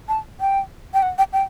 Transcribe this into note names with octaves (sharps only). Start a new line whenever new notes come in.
A5
G5
G5
F#5
G5
G5